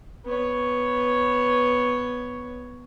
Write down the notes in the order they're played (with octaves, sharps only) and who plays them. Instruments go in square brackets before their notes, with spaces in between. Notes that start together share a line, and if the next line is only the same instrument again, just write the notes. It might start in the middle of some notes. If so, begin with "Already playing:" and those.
[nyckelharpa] B3 C#5